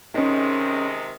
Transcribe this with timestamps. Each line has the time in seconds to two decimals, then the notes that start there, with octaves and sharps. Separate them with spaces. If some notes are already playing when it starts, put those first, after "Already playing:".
0.14 C3 D#3 G#3 C#4 D#4